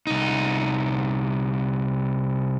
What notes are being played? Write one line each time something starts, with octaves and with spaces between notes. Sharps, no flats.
C2 D#4